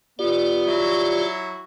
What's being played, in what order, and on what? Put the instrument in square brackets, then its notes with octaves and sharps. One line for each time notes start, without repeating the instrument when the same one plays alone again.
[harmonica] B3 [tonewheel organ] F4 G4 D5
[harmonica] F#3 E4 F#4